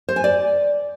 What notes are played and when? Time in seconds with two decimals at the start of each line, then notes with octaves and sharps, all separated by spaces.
0.09 C5
0.16 G#5
0.24 D5